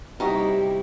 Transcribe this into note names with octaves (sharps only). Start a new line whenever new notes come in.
C3 G3 D#4 E4 F#4 G4 D#5